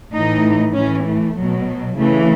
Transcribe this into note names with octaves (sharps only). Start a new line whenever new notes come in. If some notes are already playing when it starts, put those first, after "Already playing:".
A2 E3 D#4
A2 E3 C#4
A3
B2 F#3
C#3 E3 A3